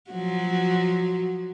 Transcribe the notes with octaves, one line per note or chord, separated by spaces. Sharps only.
F3 F#3 F#4